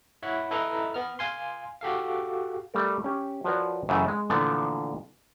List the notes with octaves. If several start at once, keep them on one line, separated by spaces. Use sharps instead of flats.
E4 C#5 F#5 B5
E4 A4 B4 D#5 A#5
B3 F6
F5 G#5 C6
F#4 G4 A4 F5
G3 A3 A#4
C#4 G4
F3 F#4 A#4 B4 C#5 D5
F#2 C#3 E3 A3 G#5
G#3
A#2 D3 E3 F3 A3 B3